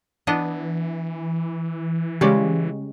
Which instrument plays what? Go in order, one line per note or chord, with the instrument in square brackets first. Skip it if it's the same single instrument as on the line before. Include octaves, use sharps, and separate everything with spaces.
[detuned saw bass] E3 [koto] B3 D4 D#5
[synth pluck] C#3 G#3 [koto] G3 C#4 D5 [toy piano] G4